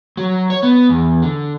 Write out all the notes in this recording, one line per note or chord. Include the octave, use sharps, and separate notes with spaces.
F#3
C#5
B3
E2
D3